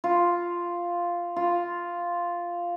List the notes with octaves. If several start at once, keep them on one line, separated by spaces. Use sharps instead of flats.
F4
F4